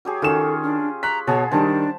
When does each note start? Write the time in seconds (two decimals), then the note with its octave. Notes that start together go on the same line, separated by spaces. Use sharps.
0.05 F#3 G4 G#4
0.22 D#3 C#4 F4 A4 E7
0.63 D4
1.03 A#5 C#6 F#6 B6
1.27 B2 G#4 C#5 A5
1.51 D#3 G3 D4 C5 A5